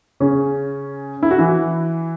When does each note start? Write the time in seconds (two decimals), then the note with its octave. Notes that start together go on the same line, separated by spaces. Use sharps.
0.20 C#3 C#4
1.23 E4
1.31 F#4
1.38 E3 E4